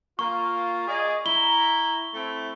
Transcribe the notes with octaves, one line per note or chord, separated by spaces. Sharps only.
A#3 F4 C#6
G#4 D5 D#5
E4 A#5 G7
A3 C4 E4